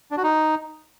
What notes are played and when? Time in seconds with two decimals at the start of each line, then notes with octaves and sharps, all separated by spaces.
0.11 D4
0.17 F#4
0.23 D#4